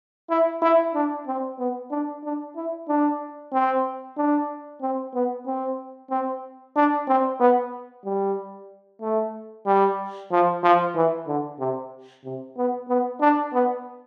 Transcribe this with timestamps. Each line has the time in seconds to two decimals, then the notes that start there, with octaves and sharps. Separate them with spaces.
0.30 E4
0.62 E4
0.94 D4
1.27 C4
1.59 B3
1.91 D4
2.24 D4
2.56 E4
2.88 D4
3.53 C4
4.17 D4
4.81 C4
5.14 B3
5.46 C4
6.10 C4
6.76 D4
7.08 C4
7.40 B3
8.05 G3
9.01 A3
9.66 G3
10.31 F3
10.63 F3
10.95 E3
11.27 D3
11.59 C3
12.24 C3
12.57 B3
12.89 B3
13.21 D4
13.53 B3